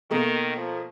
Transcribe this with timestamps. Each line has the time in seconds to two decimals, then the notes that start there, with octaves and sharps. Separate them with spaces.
0.11 B2 D#3 A3 A#3
0.57 F3